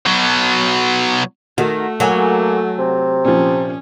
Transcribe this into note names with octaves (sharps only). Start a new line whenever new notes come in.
B2 F#3
D#3 A3 F#4
F#3 A#3 A4 F#5 G#5
C3
A#2 F3 C#4